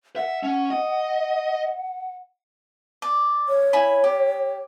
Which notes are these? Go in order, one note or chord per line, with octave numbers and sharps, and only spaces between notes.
E5 F#5
C#4
D#5
D5
C#5
E4 G#5 B5
G4